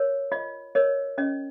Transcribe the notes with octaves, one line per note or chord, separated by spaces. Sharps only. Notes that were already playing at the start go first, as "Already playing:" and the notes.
Already playing: A#4 C#5
F4 D#5
A#4 C#5 D#5
C#4 D#5